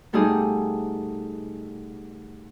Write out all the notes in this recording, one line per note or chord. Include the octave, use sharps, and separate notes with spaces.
B2 G3 A3 D#4 G4 G#4